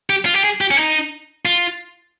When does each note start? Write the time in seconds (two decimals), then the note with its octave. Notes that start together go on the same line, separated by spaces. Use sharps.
0.10 G4
0.25 F4
0.34 G4
0.43 G#4
0.61 G4
0.71 C#4
0.77 D#4
1.45 F4